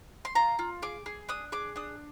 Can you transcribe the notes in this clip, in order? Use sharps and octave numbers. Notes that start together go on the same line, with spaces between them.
C6
F4 A#5
F4
G#4 D6
G#4
D4 D#6
G#4 D6
D4 D#6